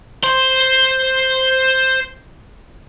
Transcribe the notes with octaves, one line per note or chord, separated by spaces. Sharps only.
C5 C6